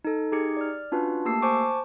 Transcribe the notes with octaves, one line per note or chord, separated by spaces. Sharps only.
D#4 A4
D#4 G4 G#4 G#6 C#7
D5 F6
C#4 D4 F4 F#4 B4
A3 A#3 G4 A5 E6 C7
C5 G#5 A5 C#6 D6